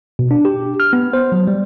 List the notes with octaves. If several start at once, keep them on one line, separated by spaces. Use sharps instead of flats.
B2
D4
G4
F6
B3
C5
F#3
G3